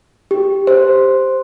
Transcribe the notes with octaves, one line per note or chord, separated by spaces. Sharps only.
G4
C5